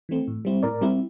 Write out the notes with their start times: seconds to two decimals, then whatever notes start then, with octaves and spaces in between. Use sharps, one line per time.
0.09 E3 A3 C4
0.28 A2
0.45 G3 C4 E4
0.63 A2 A#4 D5
0.81 G3 C4 E4